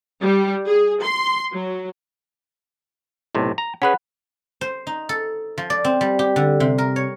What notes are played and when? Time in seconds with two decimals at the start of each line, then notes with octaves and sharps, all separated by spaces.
0.21 G3
0.67 G#4
1.04 C6
1.52 F#3
3.35 B1 A2 C3
3.58 A#5
3.82 C#4 G#4 B4 F#5 B5 F#6
4.61 C5
4.87 D#4
5.09 A4
5.58 F3
5.70 D5
5.84 C4
6.01 G3
6.19 G4
6.36 D3
6.60 C3
6.78 A#4
6.96 C#5